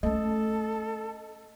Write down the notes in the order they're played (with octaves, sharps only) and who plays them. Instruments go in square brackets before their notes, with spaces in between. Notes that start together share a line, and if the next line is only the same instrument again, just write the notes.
[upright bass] A3 C#4 [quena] A4 [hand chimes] D#5